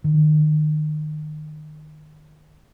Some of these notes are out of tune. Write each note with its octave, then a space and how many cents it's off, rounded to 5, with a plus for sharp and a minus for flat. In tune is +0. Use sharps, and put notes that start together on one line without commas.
D#3 -30